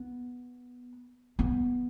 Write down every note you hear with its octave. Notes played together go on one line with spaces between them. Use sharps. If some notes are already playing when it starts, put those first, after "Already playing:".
Already playing: B3
B3